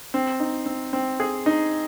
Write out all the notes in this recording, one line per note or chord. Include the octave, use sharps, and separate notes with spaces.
C4
D#4
C4
C4
G#4
D#4